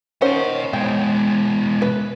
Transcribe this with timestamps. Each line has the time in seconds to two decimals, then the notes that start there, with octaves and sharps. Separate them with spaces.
0.22 D#3 C#4 C5 D#5 F#5
0.73 B2 G#3 G5
1.82 B4